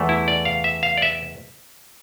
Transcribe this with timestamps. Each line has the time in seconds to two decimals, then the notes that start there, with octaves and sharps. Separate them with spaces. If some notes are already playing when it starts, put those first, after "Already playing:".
Already playing: E2 E3 A3
0.09 E4
0.28 D5
0.45 F5
0.64 E5
0.83 F5
0.97 D5
1.02 E5